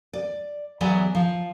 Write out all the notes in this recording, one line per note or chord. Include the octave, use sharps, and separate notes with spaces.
D5
E3 F#3 B3 G#4 D5
F3